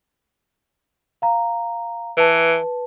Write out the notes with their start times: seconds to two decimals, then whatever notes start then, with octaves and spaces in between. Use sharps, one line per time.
1.22 F5 A#5
2.17 E3 B4 A5